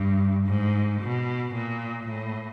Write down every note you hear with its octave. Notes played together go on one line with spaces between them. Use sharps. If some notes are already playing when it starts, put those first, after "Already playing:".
Already playing: G2
G#2
B2
A#2
A2